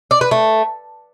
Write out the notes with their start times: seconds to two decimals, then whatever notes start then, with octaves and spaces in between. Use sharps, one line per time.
0.11 D5
0.21 B4
0.31 A3